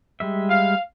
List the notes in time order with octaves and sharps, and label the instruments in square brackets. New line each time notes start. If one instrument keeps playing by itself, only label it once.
[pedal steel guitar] G3 G#3 E5
[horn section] F5